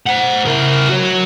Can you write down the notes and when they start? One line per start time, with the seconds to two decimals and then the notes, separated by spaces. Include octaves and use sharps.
0.06 C5 F#5
0.45 E4 A#4
0.89 F#4 C#5